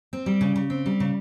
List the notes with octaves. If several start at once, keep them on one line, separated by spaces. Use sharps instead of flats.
C4
G3
C#3
C#3
C4
G3
C#3